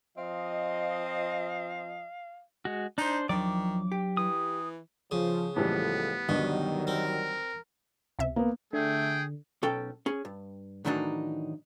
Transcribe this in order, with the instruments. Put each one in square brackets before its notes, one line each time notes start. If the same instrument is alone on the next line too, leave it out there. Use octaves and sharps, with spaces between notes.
[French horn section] F3 D#5 [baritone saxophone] C4 [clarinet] F5
[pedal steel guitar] G#3 F#4
[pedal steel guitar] D4 C5 [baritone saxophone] D#4
[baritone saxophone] D#3 [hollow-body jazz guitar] F3 D5 [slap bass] F#3 D4 [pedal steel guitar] D6
[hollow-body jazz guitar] G4
[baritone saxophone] E3 [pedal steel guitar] D#6
[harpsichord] C#3 [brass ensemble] F3
[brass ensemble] C#2 F3 A4 [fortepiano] A2 E3 G3 [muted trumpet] B3
[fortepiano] D2 G2 [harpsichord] B2 [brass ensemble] D#3 F#3 G3
[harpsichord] C4 [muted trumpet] A#4
[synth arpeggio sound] C#2 C3 E5
[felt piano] A#3 B3
[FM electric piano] D3 [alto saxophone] A3 [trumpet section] G#4 G5
[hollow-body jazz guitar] B1 C#4 A4 G5
C#4 G#4
G2
A2 D#3 E3 F#3 D4 D#4